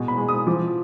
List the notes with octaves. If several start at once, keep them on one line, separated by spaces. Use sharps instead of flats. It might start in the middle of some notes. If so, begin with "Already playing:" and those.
Already playing: B2 G#3
B5
G#3
D#6
F3 D6